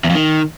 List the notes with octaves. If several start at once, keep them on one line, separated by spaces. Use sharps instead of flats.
E2
F2
D#3